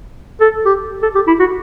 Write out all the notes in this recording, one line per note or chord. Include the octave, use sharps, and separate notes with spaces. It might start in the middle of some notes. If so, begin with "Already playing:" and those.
A4
G4
A4
G4
E4
F#4